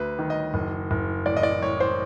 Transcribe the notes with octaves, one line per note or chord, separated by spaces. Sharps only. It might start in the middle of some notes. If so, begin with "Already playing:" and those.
Already playing: D2 B4
D#3
D#5
F#1
F#1
A1 D5
D#5
D5
A1 C#5
C5